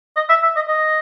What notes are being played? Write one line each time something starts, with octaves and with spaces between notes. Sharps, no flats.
D#5
E5
E5
D#5
D#5